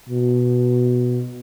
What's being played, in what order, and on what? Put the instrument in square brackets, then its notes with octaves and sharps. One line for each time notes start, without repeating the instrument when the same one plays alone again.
[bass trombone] B2